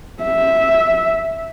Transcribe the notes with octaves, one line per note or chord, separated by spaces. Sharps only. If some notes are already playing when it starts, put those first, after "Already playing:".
E5